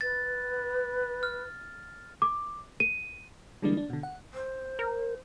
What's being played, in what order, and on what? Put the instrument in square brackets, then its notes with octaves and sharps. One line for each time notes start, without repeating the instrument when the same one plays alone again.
[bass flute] B4 [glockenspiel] A6
[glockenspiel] F6
[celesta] D6
D#7
[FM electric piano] D3 E3 G3 G#3 A#3 D4
D4
B2 D3
F#5
[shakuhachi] C5
[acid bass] A#4